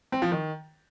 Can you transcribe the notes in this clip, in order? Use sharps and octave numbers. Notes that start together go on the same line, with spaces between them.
C4
F3
D#3